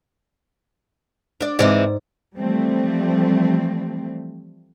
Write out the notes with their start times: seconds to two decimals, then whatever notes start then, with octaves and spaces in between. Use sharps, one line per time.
1.41 D4 D5
1.59 G#2 E3 G#3 C4 D5
2.37 E3 F3 G3 A3 C4